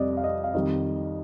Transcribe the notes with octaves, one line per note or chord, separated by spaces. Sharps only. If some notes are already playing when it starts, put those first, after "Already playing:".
Already playing: F2 C3 G3 D5 D#5
F5
D#5
F5
F2 D#3 G3 D#5